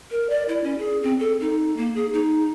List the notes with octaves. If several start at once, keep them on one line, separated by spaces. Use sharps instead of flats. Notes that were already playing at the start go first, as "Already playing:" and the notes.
A#4
D5
E4
C#4
G#4
C4
A4
D#4
A#3
G#4
D#4